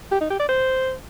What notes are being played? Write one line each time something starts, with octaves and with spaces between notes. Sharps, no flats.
G4
D#4
G4
D5
C5